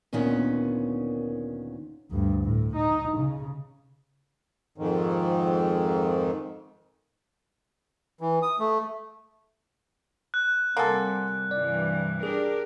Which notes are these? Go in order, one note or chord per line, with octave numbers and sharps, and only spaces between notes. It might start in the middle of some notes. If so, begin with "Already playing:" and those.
D2 A#2 D#3 B3 C#4
D2 G2
A2
D#4
C#3
F2 G#2 D#3
E3
D#6
A3
F#6
C3 G3 A#3 A4 F#5 G#5 C6
G2 C3 E3 D5
D4 G4 G#4 A#4